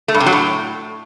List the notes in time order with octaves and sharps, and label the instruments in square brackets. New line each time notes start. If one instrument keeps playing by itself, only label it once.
[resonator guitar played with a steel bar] A3
G2
C3
F#3
A2